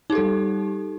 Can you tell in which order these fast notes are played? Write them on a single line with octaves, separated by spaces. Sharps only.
D#4 G4 A4 G3